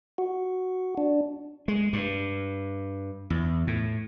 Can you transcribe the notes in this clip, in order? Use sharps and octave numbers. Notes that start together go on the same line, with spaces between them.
F#4
D4
G#3
G2
E2
A2